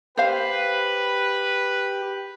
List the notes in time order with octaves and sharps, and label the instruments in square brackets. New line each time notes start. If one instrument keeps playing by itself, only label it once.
[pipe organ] G4 [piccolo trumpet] B4 [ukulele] C5 F5